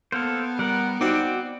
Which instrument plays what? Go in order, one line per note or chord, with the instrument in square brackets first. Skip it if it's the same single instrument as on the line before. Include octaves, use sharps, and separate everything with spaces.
[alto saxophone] A#3 [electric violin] B3 [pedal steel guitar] A4 C5
[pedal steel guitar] G3 A#4 [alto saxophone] F#5
[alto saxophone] C4 [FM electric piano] D#4 F#4 [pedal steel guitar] D5 F#5 D6